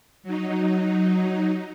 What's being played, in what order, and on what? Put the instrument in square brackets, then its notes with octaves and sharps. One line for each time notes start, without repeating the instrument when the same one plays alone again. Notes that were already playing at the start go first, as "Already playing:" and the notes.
[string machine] F#3 D#4